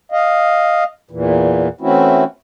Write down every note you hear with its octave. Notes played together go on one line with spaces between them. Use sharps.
D#5 F5
E2 A#2 E3
E3 A3 C4 C#4 E4 F#4